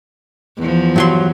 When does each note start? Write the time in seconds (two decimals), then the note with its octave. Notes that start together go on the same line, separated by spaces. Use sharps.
0.57 E2 F3
0.96 G2 F#3 C6